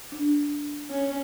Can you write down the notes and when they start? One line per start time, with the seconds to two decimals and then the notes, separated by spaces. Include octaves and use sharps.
0.12 D4
0.90 C#4